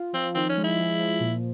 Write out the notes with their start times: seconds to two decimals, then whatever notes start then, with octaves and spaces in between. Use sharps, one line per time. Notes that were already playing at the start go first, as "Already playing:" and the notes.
Already playing: F4
0.13 F3 C4
0.35 D#3 C4
0.49 C#4
0.57 G#3
0.64 E4
0.78 F3
0.99 F3
1.20 A#2